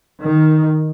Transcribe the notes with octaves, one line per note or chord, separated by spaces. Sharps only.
D#3